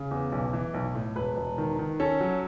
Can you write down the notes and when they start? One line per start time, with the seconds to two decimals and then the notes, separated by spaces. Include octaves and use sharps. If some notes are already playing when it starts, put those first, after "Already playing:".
Already playing: C#3
0.11 E2
0.32 B1
0.53 E3
0.74 B1
0.95 A2
1.16 E1 B4
1.37 E1
1.58 D#3
1.79 D#3
2.00 C#4 A4
2.21 F#3